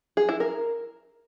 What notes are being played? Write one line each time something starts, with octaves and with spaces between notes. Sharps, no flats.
G#4
E4
A#4